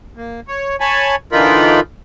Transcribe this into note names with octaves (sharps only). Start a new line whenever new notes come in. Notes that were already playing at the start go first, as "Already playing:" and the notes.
A#3
C#5
C#5 G#5 A5 B5
D3 E3 D#4 F4 A#4 B5